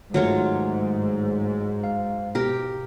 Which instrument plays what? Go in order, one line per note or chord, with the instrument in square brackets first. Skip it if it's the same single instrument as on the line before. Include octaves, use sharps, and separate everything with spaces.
[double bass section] G#2 [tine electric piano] D#3 A3 [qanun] F#3 F4 C#5
[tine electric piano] F5
[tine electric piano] B2 [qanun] G4 A#4